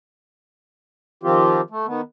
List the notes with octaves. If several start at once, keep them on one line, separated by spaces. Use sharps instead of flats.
D#3 F3 C4 F4 G4
A3
D#3 B3